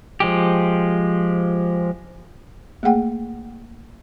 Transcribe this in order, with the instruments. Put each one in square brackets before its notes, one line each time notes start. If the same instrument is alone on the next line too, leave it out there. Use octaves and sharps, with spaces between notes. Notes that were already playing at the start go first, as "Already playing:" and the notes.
[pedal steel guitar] F3 G#3 G4
[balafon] A3 A#3 G#4 F#5 G5